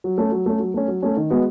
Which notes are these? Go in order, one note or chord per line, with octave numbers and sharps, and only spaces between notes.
F#3
A3 C#4
F#3
A3 C#4
F#3
A3 C#4
F#3
A3 C#4
D#3
G#3 B3 F#4